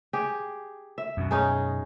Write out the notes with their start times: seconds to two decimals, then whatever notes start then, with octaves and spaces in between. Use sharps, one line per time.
0.13 G4 G#4
0.98 E5
1.17 F#2 B2
1.31 C#4 D#4 G#4